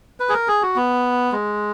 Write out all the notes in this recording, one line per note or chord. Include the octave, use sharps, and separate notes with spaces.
B4
G#4
A#4
G#4
F#4
B3
G#3